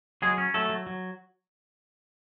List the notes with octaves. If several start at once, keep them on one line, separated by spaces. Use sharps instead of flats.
F#3 G#3 G#4
C#4
F#3 A3 A4
F#3
F#3